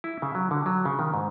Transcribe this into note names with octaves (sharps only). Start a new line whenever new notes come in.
E4
C#3
F#3
D3
F#3
C#3
D#3
G#2